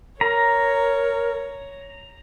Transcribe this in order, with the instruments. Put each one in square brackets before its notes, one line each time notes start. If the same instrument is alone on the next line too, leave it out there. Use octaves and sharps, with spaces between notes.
[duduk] A#4 [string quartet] C#5 [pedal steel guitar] A#5